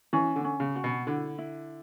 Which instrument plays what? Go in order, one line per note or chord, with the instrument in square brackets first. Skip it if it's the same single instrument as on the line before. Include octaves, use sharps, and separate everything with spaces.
[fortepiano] E3 [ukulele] C#4
[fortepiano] D3
[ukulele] C#4
[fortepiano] C#3
[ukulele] F#4
[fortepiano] B2
[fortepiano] D3 [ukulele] E4
[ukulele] E4